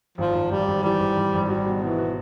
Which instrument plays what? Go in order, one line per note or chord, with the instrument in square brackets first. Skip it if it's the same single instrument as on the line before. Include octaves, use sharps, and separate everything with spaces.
[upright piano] G#1 [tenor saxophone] F3
[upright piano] G#1
[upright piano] G#1 [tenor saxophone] G3
[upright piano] G#1
[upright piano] E3 [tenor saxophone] G3
[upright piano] G#1
G#1
G#1
[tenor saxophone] G3 [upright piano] F#4
[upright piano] B2
[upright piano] B2 [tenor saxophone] E3
[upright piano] F#4